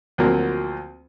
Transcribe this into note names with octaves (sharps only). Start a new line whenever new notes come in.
D2 F3 F#3 A#3 C4